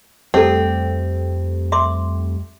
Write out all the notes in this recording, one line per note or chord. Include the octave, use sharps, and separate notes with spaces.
F2 G3 A3 C4 G4 A4 F#5
E5 C6 D6